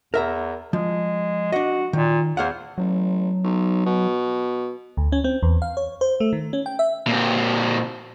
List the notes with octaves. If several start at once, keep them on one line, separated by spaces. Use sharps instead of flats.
E2 A#4 E5 A#5
F3 G#3
D4 F#4 D#5
A#2 D#3
E2 C5 F5 F#5
A1 F#3
B1
B2
D2
C#4
C4
E2
F5
C#5
C5
A3
D#3
C#4
G5
E5
A#2 C4